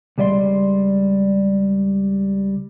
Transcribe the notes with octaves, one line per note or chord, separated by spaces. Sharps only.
C#2 G3 D5 E5 C6